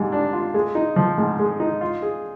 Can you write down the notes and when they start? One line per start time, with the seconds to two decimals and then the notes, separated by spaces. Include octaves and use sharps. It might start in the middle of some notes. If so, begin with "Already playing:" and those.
Already playing: G#2 G3
0.12 D4
0.33 F4
0.54 G#3
0.75 D#4
0.96 F3
1.18 G#2
1.39 G#3
1.60 D#4
1.81 F4
2.02 G#4